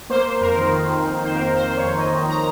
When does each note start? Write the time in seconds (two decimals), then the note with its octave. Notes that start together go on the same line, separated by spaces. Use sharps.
0.10 A#3 C5
0.25 A#3
0.41 F2 A#4
0.56 D#3
0.72 D#3
0.88 F2
1.04 D#3
1.20 D#3 C5
1.35 A#3 A#4
1.51 D#3
1.56 C5
1.67 D#3
1.77 C#5
1.82 F2
1.98 F2 D#5
2.13 D#3
2.29 A#5